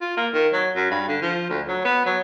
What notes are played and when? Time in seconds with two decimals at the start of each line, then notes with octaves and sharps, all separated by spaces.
0.01 F4
0.17 A#3
0.33 D#3
0.53 F#3
0.75 F#2
0.91 G2
1.08 D3
1.22 F3
1.50 D2
1.68 F#3
1.85 B3
2.06 F#3